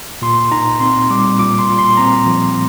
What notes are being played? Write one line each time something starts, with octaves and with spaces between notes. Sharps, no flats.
A#2 C6
D#4 A#5
C4 C6
G3 D6
A#2 D6
C6
A#2
C6
C4 A#5
F3